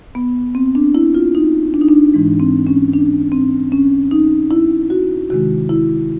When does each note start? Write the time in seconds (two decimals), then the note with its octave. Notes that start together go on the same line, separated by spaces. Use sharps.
0.15 B3
0.55 C4
0.75 D4
0.95 E4
1.14 F4
1.35 D#4
1.74 D4
1.81 D#4
1.89 D4
2.14 G#2 E3 G#3
2.40 C4
2.67 C#4
2.93 D4
3.32 C4
3.72 C#4
4.11 D#4
4.51 E4
4.90 F#4
5.30 C3 D#3 G#3 F#4
5.69 E4